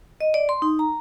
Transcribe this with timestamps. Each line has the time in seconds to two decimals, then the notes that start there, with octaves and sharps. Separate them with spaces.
0.21 D#5
0.34 D5
0.49 C6
0.62 D#4
0.79 A#5